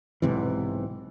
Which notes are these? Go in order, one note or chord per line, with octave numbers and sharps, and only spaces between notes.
B1 G#2 C3 E3